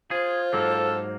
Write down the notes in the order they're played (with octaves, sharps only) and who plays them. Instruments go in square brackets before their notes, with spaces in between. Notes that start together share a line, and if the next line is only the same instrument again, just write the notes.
[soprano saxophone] F4 [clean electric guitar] G#4 [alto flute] C5
[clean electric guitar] G#2 F#3 A#3 [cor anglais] A4